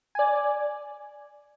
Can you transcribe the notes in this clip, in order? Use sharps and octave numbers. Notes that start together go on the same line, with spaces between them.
D5 G#5